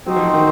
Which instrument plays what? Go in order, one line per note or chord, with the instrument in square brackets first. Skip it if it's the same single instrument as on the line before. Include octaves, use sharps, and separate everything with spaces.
[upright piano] F#3 [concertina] C4 D#4 F#4 C5
[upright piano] F3
D#3